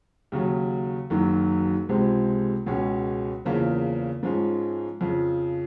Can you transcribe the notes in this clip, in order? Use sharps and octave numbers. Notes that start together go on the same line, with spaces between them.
D#2 C#3 F#3
F#1 F#2 D#3 F#3
C#2 C3 F3 G#3 C4
C#2 B2 G#3 C#4
E2 C#3 F3 A#3
G#2 F3 G#3 C#4
F2 C#3 F3